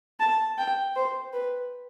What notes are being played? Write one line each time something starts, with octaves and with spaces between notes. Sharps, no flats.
A5
G5
C5
B4